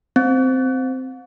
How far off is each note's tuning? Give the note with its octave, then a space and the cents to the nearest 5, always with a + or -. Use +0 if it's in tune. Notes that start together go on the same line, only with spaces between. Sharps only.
C4 -10